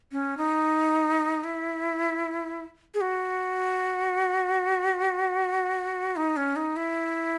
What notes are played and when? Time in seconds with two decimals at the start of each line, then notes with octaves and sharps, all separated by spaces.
0.12 C#4
0.37 D#4
1.44 E4
2.94 G#4
3.01 F#4
6.16 D#4
6.37 C#4
6.56 D#4
6.76 E4